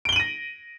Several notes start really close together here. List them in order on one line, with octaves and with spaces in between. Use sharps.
D7 G7 F#7 D#7 A#6